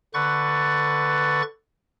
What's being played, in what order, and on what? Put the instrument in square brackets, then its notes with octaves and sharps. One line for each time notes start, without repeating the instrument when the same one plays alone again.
[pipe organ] D3 B4 C#6 F#6 A6